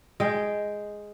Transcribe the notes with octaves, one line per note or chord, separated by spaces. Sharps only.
G#3 G5